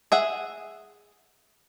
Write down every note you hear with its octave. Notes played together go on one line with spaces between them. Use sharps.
G#4 E5 F#5